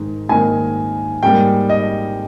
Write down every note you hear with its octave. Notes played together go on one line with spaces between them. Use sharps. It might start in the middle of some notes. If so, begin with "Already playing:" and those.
Already playing: G#2 D#3
G#2 D#3 A#3 G#5
G#2 G3 A#3 G5
D#5